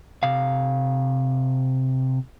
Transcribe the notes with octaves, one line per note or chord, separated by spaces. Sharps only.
C3 F5